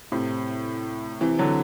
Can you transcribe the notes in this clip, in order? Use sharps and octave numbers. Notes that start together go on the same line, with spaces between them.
A2 C3
C3 E3
D3 F#3